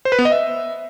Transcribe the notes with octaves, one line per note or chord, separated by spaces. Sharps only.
C5
B4
B3
D#5
E5